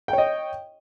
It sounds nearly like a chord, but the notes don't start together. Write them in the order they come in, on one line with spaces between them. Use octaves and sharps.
G5 C#5 D#5